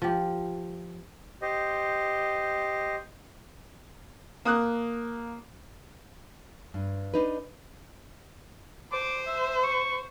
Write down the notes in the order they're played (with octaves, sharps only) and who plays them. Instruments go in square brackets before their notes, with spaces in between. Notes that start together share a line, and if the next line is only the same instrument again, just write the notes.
[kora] F3 G4
[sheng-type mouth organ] G4 C5 D#5
[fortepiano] A#3 D#6 F#6
[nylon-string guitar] G2
D4 D#4 B4
[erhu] C5 [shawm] D6
[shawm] E5
C#6